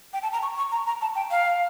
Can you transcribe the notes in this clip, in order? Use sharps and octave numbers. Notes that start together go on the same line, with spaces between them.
G5
A5
A#5
C#6
C#6
A#5
A#5
A5
G5
F5